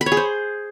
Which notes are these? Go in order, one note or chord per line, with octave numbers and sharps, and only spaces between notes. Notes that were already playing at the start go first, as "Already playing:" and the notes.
B5
C#5
G#4
C5